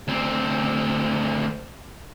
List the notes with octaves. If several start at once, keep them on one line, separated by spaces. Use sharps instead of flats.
D2 C4